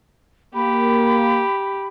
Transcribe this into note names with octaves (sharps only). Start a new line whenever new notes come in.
A#3 G4 B5